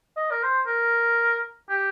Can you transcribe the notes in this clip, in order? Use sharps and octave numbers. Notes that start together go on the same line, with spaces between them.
D#5
A#4
C5
A#4
G4